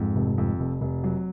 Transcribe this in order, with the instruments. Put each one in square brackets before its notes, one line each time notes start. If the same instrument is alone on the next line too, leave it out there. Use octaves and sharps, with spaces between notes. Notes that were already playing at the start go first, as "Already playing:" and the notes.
Already playing: [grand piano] F2 [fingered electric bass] G#2
[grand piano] F1
F2
F1
F1
F#3